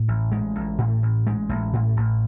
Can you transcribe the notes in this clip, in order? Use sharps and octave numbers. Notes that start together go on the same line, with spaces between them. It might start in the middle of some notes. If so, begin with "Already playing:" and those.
Already playing: A2
A1
G#3
A1
A2
A1
G#3
A1
A2
A1